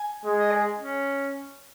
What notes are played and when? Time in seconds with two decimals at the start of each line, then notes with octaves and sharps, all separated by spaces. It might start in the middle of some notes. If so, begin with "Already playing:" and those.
Already playing: G#5
0.25 G#3
0.39 D#5
0.51 G#4
0.77 C#4